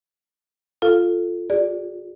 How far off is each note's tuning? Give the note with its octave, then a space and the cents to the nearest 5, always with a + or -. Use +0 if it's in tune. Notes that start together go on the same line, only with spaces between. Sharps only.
F4 +0 A4 +0 F5 +0
F4 +40 G#4 -30 D5 +0